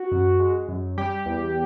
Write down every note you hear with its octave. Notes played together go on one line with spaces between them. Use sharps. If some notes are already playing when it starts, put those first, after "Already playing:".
Already playing: F#4
F#2
G#3
F#2
G3 G4
E2